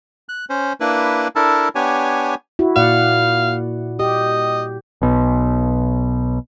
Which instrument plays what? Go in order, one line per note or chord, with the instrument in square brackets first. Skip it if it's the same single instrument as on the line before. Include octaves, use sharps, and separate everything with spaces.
[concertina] F#6
C#4 C5
A#3 D4 E4 B4
D4 E4 A4 A#4 A5
B3 D4 G4 C#5 G#5
[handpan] E4 F#4
[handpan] A#2 D5 F#5 [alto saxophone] F5
[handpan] G4 [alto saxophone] D#5
[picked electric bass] B1 B2